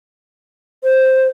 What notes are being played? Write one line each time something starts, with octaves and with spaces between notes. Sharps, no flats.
C5